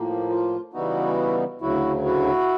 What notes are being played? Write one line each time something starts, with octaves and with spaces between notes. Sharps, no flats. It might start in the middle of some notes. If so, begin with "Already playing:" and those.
Already playing: A2 F3 A#3
F4
C#3 E3 G3 B3 D#4 E4 F#4
D2 C#3 F#3 E4 F#4
E4 F#4